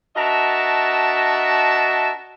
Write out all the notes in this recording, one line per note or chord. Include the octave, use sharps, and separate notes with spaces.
D4 F#4 A#4 D#5 E5 A5